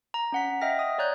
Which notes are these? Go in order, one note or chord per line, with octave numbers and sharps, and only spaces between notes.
A#5
C#4 F#5 B6
D#5 E5 G5 F6 A#6
D#6
C#5 D5 A#5 F#6 G6